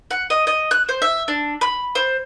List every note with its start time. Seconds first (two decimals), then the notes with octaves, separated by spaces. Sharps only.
0.11 F#5
0.30 D#5
0.47 D#5
0.71 F#6
0.89 C5
1.02 E5
1.28 D4
1.61 B5
1.95 C5